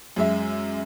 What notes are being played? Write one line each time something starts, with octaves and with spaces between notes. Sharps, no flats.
F#2 G#3 E5